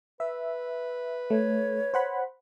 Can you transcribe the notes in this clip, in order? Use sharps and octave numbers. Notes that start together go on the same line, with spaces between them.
B4 E5
A3 C#5
C5 F#5 B5